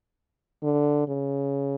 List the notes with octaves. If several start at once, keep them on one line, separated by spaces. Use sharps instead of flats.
D3
C#3